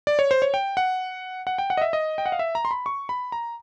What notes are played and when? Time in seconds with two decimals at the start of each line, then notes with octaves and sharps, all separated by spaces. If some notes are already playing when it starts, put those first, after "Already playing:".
0.07 D5
0.19 C#5
0.31 C5
0.42 C#5
0.54 G5
0.77 F#5
1.47 F#5
1.58 G5
1.70 F#5
1.77 D#5
1.81 E5
1.93 D#5
2.18 G5
2.26 F#5
2.32 F5
2.39 E5
2.55 A#5
2.65 C6
2.71 B5
2.86 C#6
3.09 B5
3.32 A#5